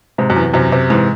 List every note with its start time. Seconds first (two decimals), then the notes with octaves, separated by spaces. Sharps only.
0.18 G#2 C3
0.30 F#2
0.36 E2
0.54 F#2 C3
0.72 C3
0.90 G#2 E3